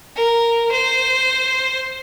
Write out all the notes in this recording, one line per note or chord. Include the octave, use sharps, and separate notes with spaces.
A#4
C5